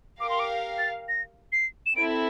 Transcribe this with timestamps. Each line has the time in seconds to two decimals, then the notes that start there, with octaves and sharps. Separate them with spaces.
0.20 G4 A#4 F5 D6
0.30 C6
0.39 D6
0.78 A6
1.09 A#6
1.52 C7
1.86 E7
1.96 C4 E4 A4 D7